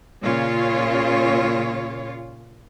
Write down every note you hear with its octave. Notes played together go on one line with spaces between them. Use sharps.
A#2 C#3 F4 C#5